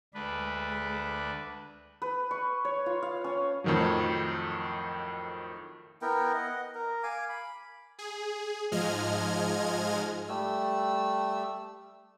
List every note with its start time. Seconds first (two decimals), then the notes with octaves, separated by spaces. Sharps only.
0.14 D2 G#3 D4 B4
2.02 B4
2.31 C#6
2.65 C#5
2.86 F4
3.02 F5
3.24 C#4
3.64 F2 A2 D#3 F3 F#3
6.02 B3 E4 A#4 G5
6.35 D#5 F#5
6.75 A#4
7.03 F5 G#5 D6
7.29 B5
7.99 G#4
8.71 G#2 F3 G#3 D#5 F6 G#6
10.29 G3 A3 E6